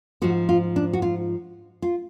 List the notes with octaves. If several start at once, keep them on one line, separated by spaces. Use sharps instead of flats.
G#2 F3 F#4
F4
D4
F#4
F4
F4